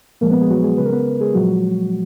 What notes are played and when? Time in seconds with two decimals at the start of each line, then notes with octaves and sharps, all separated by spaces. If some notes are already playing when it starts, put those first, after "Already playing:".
0.21 A#2 F3 G#3 A#3 A#4
0.31 B3 B4
0.41 G#3 G#4
0.50 F#3 F#4
0.63 G#3 G#4
0.77 C#3 G#3 B4
0.86 A#4
0.92 B3 B4
1.20 G#3 G#4
1.34 A#2 F3 F#3 G#3 F#4